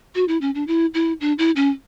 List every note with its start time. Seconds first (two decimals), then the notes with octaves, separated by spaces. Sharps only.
0.15 F#4
0.28 E4
0.41 C#4
0.55 D4
0.67 E4
0.94 E4
1.20 D4
1.38 E4
1.56 C#4